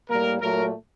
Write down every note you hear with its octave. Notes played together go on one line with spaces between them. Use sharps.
A2 G3 A#3 A#4
A#2 F#3 A3 A#4